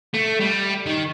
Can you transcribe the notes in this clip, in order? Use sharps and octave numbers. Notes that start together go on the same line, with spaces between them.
A3
G3
D#3